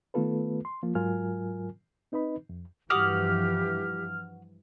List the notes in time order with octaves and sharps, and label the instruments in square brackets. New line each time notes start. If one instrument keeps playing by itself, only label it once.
[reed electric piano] D#3 A3 B3 F4 A4 B4
C6
F3 A#3 F4
G#2 F#3 F4 A#4 G#5 F6
C4 D#4 B4 D#5 B5
F2
[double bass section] G2 E3 F3 [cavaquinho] F#4 D6 D#6 [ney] G4 [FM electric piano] F6